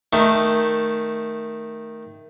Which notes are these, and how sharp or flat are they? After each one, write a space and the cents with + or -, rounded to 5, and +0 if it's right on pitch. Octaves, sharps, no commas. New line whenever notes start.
D#3 +0 A3 +0